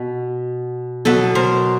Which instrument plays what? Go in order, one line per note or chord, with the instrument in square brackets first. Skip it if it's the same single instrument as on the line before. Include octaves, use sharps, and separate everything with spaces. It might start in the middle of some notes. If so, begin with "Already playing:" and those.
Already playing: [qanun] B2
B2 F#3 B3 A4 B4
A#4 C5